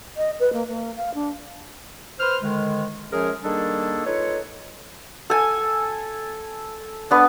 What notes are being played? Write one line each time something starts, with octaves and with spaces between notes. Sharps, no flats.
D#5
B4
A#3
A#3
F5
D4
B4 C5 C6 F6
G#2 D3 D#3 G#3
F#2 F3 G#3 C#4 G#4 A#4
D#3 G3 A#3 D4 G#4 A4
D#4 F4 A4 B4 C#5
A4 G#5
B3 D4